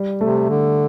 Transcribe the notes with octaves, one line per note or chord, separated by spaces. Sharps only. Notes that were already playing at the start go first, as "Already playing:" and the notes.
Already playing: G3
C3 A3
D3